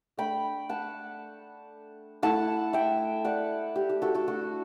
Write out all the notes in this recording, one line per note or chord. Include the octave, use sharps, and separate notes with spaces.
A3 D4 G5 B5
F#5 A5
A3 E4 F#5 A5
E5 G5
D5 F#5
G4
G4
F#4 A4
F#4 A4
A3 D4 F#4